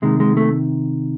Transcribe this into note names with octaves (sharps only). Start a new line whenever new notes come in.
C3 D#3 G#3
G#3
A3